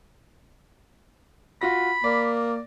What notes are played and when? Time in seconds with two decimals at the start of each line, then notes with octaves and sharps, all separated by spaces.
1.61 F4 F#4 B5 A#6
2.04 A#3 D5